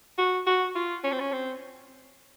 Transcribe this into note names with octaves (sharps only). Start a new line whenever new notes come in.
F#4
F#4
F4
C#4
C4
C#4
C4